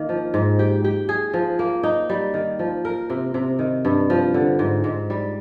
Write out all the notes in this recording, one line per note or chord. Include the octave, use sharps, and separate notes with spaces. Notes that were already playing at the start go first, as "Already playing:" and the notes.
Already playing: D#3 A#3
F3
G#2
G4
G4
G#4
F3
A#3
D#4
G3
D#3
F3
A#4
C3
C3
D#3
G2
F3
D3
G#2
G#2
G3